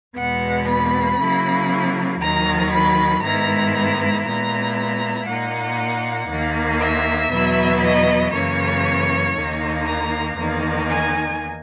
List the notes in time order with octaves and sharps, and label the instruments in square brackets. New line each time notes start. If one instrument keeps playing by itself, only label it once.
[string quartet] E2 B2 G#3 B3 F#5
B5
C#3 F#3 A#3 E4
D#2 D#3 F#3 A#5
B5
G#2 D#3 G#3 B3 E4 A#5
A#5
A#2 G#3 B3 E4 A#5
A#5
A#2 A#3 D#4 F#5
D#2 D#3 A#3
E5
E2 B2 F#3 B3 E4
D#5
F#2 C#3 E3 A#3 C#5
D#2 D#3 A#3 D#4
A#5
E2 D#3 A#3 D#4
G#5